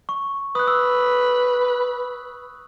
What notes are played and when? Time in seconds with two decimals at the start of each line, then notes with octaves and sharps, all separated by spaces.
0.09 C#6
0.55 B4 D#6 F#6
0.68 E6